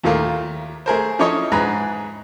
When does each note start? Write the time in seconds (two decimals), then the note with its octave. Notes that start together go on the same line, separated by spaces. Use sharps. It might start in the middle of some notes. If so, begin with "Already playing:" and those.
0.04 D#2 A#2 A3 F4 A#4
0.86 A3 G#4 A#4 C5
1.19 F3 C#4 E4 A4 C#5 D#5
1.52 G#2 G#4 B4 A#5